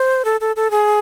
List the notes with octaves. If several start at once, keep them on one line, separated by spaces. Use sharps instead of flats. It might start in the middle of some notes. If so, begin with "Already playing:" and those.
Already playing: C5
A4
A4
A4
G#4